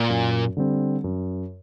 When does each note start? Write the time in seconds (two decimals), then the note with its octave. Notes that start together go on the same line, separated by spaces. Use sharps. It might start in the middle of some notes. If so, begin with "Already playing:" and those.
Already playing: A#2
0.10 F#2
0.57 D3 G3 C4
1.04 F#2